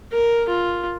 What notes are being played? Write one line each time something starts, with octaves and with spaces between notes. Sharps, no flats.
A#4
F4